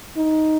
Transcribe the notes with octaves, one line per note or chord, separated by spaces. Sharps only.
D#4